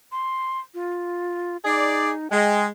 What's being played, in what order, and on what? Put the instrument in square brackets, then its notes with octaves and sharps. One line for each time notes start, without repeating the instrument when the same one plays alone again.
[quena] C6
F4
[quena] D#4 [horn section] G#4 D5
[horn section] G#3 [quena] G5